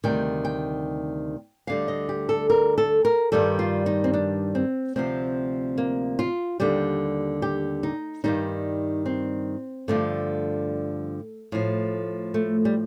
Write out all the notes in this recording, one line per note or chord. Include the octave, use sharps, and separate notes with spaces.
D2 C3 D#3 G3 G5
G5
D2 D3 G3 F5
D#5
G4
A4
A#4
A4
A#4
G2 D#3 G3 A4
F4
D#4
C4
D4
C4
D2 C3 F3 C4
A#3
F4
D#2 D3 G3 G4
G4
D#4
G2 D#3 G3 D#4
C4
G2 D3 F3 A3
A2 F3
A3
G3